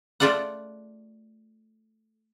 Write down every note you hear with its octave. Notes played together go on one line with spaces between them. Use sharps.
A3 F4 A4 D5 F#5